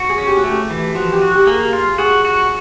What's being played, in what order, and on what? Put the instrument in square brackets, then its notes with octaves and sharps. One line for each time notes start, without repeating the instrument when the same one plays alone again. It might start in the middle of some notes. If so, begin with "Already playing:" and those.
Already playing: [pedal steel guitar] F#4
[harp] G#4
[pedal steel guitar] C#4
[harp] G4
F#4
[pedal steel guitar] A3 [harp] G4
[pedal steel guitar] E3
[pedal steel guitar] F3 [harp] F#4
[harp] G4
[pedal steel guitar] F#4
[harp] G4
[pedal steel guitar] A#3 [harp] G#4
[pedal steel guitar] F4
[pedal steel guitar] F#4 [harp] G#4
[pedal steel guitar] F#4